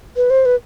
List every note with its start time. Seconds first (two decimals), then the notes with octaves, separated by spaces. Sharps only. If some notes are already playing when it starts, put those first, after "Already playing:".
0.16 B4
0.30 C5
0.45 B4